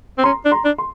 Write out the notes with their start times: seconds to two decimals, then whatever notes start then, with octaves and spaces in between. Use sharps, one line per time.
0.18 C4
0.24 C#4 A#5 C6
0.45 D4
0.52 A#5 C6
0.65 D4
0.78 C6